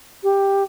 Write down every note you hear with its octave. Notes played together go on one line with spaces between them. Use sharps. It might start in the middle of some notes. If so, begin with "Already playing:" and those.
G4